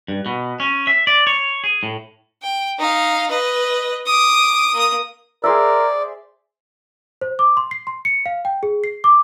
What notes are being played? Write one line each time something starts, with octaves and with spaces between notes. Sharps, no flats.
G2
B2
C#4
E5
D5
C#5
G#4
A2
G5
D#4 F5
B4 D#5
D6 D#6
A#3 D#6
G#4 A#4 C5 D5 E5 E6
C5
D6
C6
C7
C6
C#7
F5
G5
G#4
C7
D6